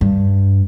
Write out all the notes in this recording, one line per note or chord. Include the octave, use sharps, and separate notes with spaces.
G2